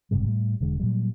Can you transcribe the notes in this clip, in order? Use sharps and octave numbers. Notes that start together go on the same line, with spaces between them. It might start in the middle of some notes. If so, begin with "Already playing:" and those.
F#1 G#2 C3 G3
A2 G3
E1 D3 G#3
A#2 F#3 G3